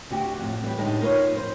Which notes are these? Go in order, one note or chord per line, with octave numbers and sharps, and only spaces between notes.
D2 F#4 G4
F2 A2
A2 E3 G3
A2 D3 G#3 D#4 G4 A5
D#4 F4 A#4 B4 C#5
F2 C5